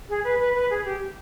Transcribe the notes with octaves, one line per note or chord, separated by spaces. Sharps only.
G#4
B4
B4
B4
G#4
G4